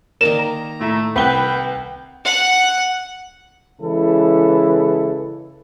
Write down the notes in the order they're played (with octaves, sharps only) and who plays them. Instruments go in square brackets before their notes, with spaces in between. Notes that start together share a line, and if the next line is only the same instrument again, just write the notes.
[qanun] D#3 A#3 D5 [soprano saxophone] A#4 [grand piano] E7
[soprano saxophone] A#5
[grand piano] A2 E4 [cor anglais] A3
[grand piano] C2 F#5 G7 [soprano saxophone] B4 [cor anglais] G5
[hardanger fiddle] F#5
[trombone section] C#3 E3 G#3 E4 A4 B4